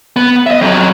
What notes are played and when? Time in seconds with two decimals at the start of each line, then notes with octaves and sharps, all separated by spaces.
0.16 B3
0.47 D#5 E5
0.61 F2 F#3